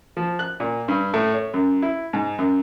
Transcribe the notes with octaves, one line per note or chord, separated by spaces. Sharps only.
F3
F#6
A#2
G2
A2
C#5
F#2
E4
G#2
F#2